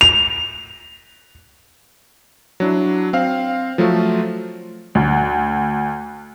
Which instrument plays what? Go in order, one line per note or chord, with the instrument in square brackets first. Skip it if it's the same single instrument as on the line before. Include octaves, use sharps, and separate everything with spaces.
[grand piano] F7
[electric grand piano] F#3 D4 E4
C4 F5
F3 F#3 A3 F4
[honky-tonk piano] D2